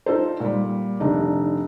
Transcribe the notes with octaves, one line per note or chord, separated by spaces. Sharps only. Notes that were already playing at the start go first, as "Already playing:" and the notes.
D#4 F4 A4 C5
A#2 G3
F1 D#3 D4 D#4